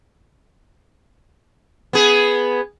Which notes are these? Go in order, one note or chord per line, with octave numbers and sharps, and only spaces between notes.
B3 G#4